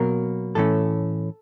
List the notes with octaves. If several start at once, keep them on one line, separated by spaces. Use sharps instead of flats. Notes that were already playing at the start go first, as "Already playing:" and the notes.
Already playing: B2 F#3 A#3 A#4
A2 E3 A3 C#4 A4